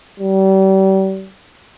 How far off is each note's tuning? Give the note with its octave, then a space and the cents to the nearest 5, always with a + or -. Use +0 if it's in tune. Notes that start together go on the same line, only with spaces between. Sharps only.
G3 -35